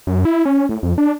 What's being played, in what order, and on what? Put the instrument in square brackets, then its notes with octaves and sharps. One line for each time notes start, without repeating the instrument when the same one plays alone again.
[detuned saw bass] F#2
E4
C#4
A2
F2
D4